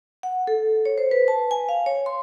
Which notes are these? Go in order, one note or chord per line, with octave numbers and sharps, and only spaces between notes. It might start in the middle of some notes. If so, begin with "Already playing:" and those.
F#5
A4
C#5
C5
B4
A5
G#5
F5
C#5
C6